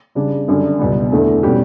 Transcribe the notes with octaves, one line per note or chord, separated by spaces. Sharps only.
C#3 G3 D4
F#2 D3 G3 D4
C#2 B2 G3 B3
E2 D3 A3 D4
B2 G3 C#4 G4